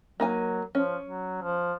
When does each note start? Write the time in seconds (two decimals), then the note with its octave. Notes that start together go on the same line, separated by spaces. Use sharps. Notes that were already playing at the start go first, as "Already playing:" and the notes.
0.20 F#3 A#3 D#4 G#5
0.75 F3 C#4
1.04 F#3
1.42 F3